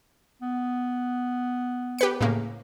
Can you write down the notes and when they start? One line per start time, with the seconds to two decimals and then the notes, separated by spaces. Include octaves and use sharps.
0.42 B3
1.98 G4 B4 C#7
2.21 A2 C#3 A#3